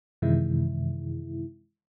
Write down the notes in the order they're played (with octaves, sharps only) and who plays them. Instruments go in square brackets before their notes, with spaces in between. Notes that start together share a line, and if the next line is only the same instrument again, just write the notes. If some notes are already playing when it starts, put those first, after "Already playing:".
[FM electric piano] F#2 C3 D#3 E3 G#3 E4